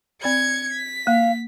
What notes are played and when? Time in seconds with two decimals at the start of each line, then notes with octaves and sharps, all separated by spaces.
0.23 C4 D5 B5 G#6 C#7
0.73 B6
1.07 A#3 F5